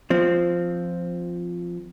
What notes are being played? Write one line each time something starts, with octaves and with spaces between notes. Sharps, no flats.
F3 C4